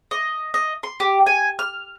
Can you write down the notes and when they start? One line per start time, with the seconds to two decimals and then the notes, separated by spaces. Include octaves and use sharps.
0.11 D#5
0.54 D#5
0.83 C6
1.00 G4
1.26 G#5
1.59 F6